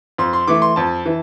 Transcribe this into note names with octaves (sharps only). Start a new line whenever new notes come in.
F2 C6
C6
E3 A3 D6
C6
F2 A5
E3